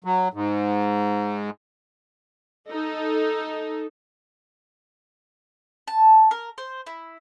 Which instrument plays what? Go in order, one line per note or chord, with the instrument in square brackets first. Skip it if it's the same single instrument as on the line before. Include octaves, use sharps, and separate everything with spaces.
[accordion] F#3
G#2
[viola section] D#4 A4
[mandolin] A5
A#4
C5
E4